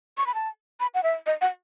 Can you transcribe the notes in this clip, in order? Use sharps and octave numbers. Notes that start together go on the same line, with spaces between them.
C#6
B5
A5
B5
F#5
E5
D#5
F#5